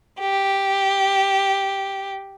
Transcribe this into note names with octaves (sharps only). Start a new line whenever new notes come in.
G4